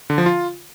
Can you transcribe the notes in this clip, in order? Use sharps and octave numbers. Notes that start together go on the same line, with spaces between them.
D3
F3
F4